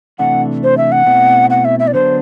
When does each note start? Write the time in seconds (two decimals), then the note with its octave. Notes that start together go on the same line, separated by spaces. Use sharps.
0.19 C3 E3 A3 D4 F#5
0.63 C5
0.77 E5
0.92 F#5
1.06 B2 A3 C4 E4
1.50 F#5
1.65 E5
1.79 E5
1.87 D5
1.94 D3 F#3 B3 D4 C5